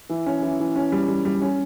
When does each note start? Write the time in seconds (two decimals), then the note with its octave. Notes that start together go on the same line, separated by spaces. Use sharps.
0.09 E3
0.26 C#4
0.43 E3
0.60 E3
0.76 C#4
0.92 G3
1.08 G3
1.25 G3
1.42 C#4